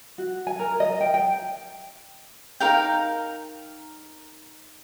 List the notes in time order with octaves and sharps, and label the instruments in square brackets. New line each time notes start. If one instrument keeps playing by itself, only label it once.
[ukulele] F#4
G#5
A#4
D#5
G5
G5
[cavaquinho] D#4 A#4 F5 G5